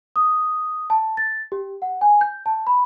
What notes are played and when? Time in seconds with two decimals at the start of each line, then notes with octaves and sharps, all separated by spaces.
0.16 D#6
0.90 A5
1.17 A6
1.52 G4
1.82 F#5
2.01 G#5
2.21 G6
2.46 A5
2.67 B5